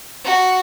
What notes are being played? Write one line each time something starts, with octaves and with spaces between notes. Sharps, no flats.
F#4